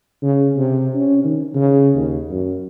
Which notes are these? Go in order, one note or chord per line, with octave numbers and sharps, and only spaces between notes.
C#3
C3
C#4
D#3
C#3
D#2
F#2